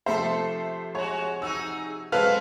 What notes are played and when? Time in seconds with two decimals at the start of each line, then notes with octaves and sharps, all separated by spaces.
0.06 C3 F3 A3 A4 C5 E5
0.95 G#3 F#4 C#5
1.42 D#4 F#4 G#4 E6
2.12 F#3 G#3 C4 A4 B4 F5 F6